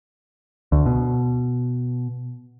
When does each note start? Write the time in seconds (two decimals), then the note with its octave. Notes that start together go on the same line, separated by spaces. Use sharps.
0.72 D2
0.86 B2